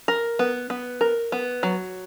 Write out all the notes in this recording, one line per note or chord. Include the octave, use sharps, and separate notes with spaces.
A#4
B3
B3
A#4
B3
F#3